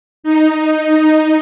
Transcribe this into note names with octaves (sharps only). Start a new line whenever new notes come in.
D#4